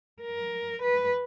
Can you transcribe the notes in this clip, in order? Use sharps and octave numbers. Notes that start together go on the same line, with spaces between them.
A#4
B4